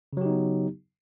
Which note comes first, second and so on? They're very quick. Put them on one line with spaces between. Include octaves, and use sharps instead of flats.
C#3 F#3 G4 D#4 B3